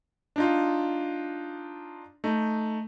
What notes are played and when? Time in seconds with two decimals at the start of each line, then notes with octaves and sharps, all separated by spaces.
0.36 D4 D#4 F4
2.24 A3 D#4